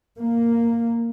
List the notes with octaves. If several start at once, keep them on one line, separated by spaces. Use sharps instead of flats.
A#3